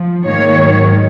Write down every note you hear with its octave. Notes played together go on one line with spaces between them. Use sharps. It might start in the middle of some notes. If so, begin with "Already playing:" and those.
Already playing: F3
G#2 D#3 A#3 C#5
G#2 D#3 F#3